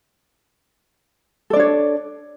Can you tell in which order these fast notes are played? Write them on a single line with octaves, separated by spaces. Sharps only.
A4 D5 D4 C#5